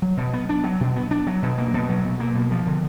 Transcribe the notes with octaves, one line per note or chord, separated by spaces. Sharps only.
F#3
B2
B3
D4
F#3
B2
B3
D4
F#3
B2
A#3
B2
F#3
B2
A#3
B2
F3
D3